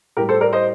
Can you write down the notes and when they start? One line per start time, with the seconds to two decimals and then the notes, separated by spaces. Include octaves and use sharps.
0.17 A2 G4 A#4
0.20 G3
0.29 A4 C5
0.41 A#4 D5
0.53 C5 D#5